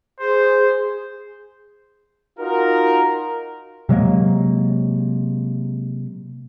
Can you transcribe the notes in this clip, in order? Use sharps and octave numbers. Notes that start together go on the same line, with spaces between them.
G#4 C5
D#4 F4 F#4 A#4
C3 F#3 G#3 A#3